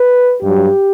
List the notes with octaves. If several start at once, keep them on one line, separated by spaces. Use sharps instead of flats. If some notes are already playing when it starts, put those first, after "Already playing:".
Already playing: B4
G2 F#3 G4